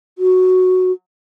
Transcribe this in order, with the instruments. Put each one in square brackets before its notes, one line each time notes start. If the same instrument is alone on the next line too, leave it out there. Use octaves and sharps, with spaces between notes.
[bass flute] F#4